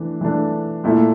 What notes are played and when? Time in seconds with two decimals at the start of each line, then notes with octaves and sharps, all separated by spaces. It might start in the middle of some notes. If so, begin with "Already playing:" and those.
Already playing: E3 A3 D4
0.21 E3 A3 D4
0.84 A#2 A3 E4